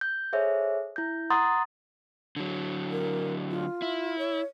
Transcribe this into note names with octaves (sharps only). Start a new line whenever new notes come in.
G6
G#4 A4 C5 C#5 E5
E4 G6
F#5 A#5 C6 D#6 A6
D3 F#3
A#4
F4
E4
C#5